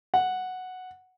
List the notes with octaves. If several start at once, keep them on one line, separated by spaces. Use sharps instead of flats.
F#5